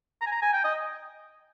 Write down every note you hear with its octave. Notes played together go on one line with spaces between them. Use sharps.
A#5
G#5
A#5
G#5
G5
D#5